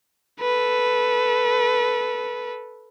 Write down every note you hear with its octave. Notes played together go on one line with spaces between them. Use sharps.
A4 B4